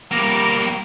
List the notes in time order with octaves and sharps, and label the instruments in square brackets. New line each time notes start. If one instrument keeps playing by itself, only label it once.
[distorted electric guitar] G3 A#3 [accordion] A#5 D6